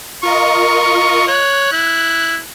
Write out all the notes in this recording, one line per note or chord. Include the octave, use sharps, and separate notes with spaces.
F4 A#4 D#5 C#6
C#5 F#6
E4